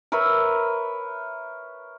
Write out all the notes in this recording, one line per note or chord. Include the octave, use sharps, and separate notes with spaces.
A#4 B4 C#5 E5